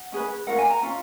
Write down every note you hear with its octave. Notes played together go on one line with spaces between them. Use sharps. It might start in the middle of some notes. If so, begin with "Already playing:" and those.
Already playing: F#5
C#4 G#4 B4
C#4 F4 A#4 F#5
G#5
A#5
C#4 F4